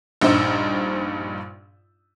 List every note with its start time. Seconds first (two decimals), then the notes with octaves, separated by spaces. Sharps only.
0.21 A#1 G2 D#4 C5 E6